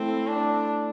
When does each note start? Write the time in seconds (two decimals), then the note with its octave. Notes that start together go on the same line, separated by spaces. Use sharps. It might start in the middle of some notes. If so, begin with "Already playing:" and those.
Already playing: A3 C4 E4 A4
0.27 D4